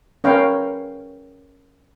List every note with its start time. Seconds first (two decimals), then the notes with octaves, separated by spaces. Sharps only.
0.24 C#4 A#4 B4 C#5 F5 G5